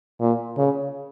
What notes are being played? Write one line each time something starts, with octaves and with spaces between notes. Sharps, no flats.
A#2
C#3